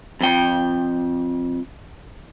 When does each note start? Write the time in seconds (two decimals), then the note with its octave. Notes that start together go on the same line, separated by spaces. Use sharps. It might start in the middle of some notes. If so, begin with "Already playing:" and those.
0.21 F2 G5